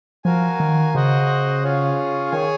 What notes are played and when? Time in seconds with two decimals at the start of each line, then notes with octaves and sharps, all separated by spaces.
0.25 F3 F#4 A#4 F5 G#5
0.60 D#3
0.94 C#3 F#4 C5 D#5 F#5
1.63 C#4 F4 G#4 C#5 F5
2.32 D#3 G#4 C#5 G#5